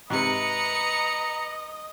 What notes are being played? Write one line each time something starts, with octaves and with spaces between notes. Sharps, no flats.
G#2 C3 B4 D#5 A#5 C#7